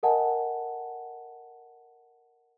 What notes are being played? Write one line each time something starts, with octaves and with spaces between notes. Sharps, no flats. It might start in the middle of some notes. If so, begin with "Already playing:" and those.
A4 A#4 D#5 F#5 G#5 A5